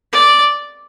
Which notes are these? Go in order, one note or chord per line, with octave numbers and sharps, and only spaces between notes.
D5